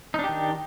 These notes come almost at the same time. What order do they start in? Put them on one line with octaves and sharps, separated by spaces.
D#4 D4 G4 D#3